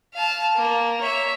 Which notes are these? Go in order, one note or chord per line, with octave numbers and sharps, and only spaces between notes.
F5 A5
A#3
C#5 E5